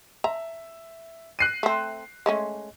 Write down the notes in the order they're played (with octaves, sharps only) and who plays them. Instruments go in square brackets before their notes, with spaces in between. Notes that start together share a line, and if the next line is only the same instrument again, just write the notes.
[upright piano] E5 [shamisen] A#5
[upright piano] F#6 C7 D#7
[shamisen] A3 C4
G#3 A3 C#4